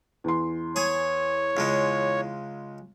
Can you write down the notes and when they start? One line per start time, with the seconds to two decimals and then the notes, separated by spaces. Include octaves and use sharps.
0.24 E2 C6
0.76 G#4 C#5 G#5
1.57 C#2 C#3 G#3